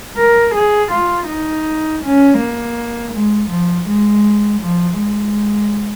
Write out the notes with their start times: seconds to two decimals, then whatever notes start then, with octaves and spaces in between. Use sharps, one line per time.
0.17 A#4
0.54 G#4
0.91 F4
1.27 D#4
2.02 C#4
2.38 A#3
3.14 G#3
3.49 F3
3.87 G#3
4.61 F3
4.98 G#3